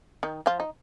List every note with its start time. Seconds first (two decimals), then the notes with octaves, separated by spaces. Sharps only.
0.23 D#3 D#4
0.46 F3 F4
0.60 D#4